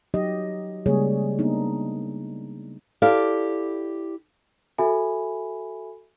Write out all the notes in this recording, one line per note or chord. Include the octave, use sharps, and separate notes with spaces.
F#3 D#4 G4 D#5
C#3 G3 G#3 A#3 G#4 C#5
A#3 B3 D4 D#4
E4 G4 A4 D5 F5
F#4 A4 E5 G#5 B5